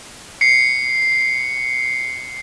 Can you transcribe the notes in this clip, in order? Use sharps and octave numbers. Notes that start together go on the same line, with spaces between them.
C7 C#7